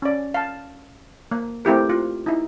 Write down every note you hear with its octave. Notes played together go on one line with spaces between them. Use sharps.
C#4 D5
F5 A5
A#3
A3 C4 E4 G4 A#4
F4
D#4 E4